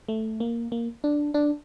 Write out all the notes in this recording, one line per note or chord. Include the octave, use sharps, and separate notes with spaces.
A3
A#3
A#3
D4
D4